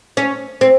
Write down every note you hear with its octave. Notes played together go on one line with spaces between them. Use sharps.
C#4
C4